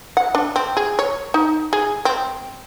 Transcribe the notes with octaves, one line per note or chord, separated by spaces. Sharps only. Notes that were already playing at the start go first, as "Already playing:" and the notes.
F#5
D4
C4
G#4
C#5
D#4
G#4
C4